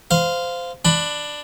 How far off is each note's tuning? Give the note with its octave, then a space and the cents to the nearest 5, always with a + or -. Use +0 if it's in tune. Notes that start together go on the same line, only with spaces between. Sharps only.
C5 -20 F5 +0
D4 +10 B5 +10